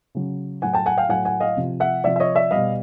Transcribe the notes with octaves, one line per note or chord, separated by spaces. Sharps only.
C#3 F#3
A2 F#3 F#5 G#5
G5 A5
F#5 G#5
F5 G5
A2 F#3 F#5 G#5
F#5 G#5
D#5 F5
C3 F3
E5 F#5
C3 F3 D5 E5
E5
C#5 D#5
D5 E5
B2 G3 D#5 F5